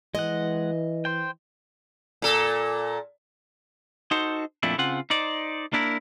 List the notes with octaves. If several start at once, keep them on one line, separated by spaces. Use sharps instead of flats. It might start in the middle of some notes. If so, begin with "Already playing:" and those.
E3 G#3 D#5 F#5
C5 G5
A#2 A4
D#4 F#4 A4 C5
F2 A#2 A3 D4 E4
C#3 C4 F4 F#5
D#4 C5 D5
A#3 D4 E4 A#4